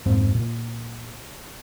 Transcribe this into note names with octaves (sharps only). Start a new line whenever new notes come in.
A#1 F2 G#2 C4
A#2